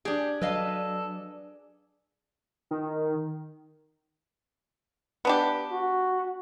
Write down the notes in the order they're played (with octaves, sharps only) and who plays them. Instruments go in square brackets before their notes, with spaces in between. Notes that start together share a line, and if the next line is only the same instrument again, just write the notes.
[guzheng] D4 G#4 [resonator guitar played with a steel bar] G4
[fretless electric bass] F#3 [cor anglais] A4 [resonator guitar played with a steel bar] B4 D#5 F5
[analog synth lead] D#3
[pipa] B3 D4 G4
[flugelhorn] F#4